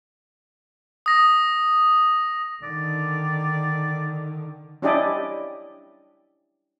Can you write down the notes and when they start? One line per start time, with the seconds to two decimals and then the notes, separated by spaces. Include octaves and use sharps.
1.06 D#6 A#6
2.63 D3 D#3 D5
4.82 C#4 D4 E4 G4 D5 D#5